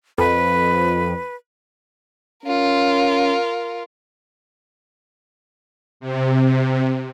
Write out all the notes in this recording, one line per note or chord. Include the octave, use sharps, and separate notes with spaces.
F2 B4
C#4 F4 A#4
C3